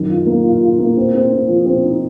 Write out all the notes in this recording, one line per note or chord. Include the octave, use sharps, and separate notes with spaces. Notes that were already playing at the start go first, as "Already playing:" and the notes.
Already playing: F#2 D#3
F4
A#3
F4
F4
A#3
C4
C4
C4
F3
C4
D#4